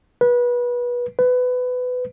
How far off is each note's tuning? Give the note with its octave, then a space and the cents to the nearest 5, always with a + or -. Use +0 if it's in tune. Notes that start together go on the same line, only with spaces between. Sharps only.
B4 -25
B4 +20